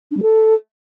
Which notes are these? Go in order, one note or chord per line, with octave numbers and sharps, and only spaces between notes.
D4
G3
A4